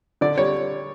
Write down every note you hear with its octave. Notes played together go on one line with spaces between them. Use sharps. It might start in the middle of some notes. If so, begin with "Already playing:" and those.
D3 D5
G3 C#5